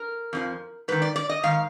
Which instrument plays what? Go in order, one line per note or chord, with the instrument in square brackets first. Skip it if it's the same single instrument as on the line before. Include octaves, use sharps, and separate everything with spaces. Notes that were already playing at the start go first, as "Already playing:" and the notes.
Already playing: [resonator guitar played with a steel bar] A#4
F2 D3 F3
G#2 D#3 B4
D5
D5
D#5
G#2 D#3 F5